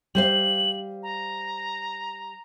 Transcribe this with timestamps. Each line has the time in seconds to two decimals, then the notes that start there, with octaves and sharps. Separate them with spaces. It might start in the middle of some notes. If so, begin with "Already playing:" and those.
0.15 G3 C5 F5 F#7
1.03 A#5